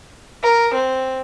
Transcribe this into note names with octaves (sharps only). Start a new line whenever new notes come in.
A#4
C4